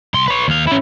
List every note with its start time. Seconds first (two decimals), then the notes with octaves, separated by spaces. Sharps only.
0.14 C2 C6
0.28 B4 C#5
0.48 D#2 F5
0.67 C#4 E4